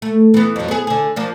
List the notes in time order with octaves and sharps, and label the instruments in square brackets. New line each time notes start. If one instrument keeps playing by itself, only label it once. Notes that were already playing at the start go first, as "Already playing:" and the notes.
[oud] A3
E3 B3
F2 F#3
B3 G#4
D3 G#4
F3 A#3 D4